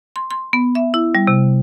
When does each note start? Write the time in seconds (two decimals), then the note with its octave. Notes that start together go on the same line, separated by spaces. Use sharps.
0.16 C6
0.31 C6
0.53 B3
0.75 E5
0.94 E4
1.15 G3
1.27 C3